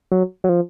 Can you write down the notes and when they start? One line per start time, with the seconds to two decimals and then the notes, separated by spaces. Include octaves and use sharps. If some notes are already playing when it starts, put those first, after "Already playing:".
0.12 F#3
0.44 F#3
0.49 F3